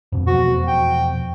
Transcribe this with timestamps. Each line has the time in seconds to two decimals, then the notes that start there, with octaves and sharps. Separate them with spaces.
0.12 F2 B2
0.27 E2 B2 F3 F#4
0.67 G5